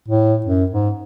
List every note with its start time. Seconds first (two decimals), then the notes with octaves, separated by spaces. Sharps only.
0.08 A2
0.46 F#2
0.71 G#2